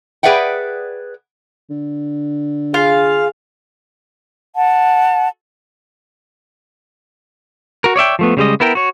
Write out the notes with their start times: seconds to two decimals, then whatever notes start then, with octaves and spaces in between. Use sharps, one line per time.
0.23 G#4 B4 D5 E5 F#5 G5
1.70 D3
2.74 F4 G#4 F5
4.56 F#5 A5
7.84 F#4 A#4
7.96 C#5 D5 E5 G5
8.19 F3 A3 B3
8.37 C#3 G3 G#3 D#5
8.60 B3 E4 A#4 G5
8.75 F#4 C#5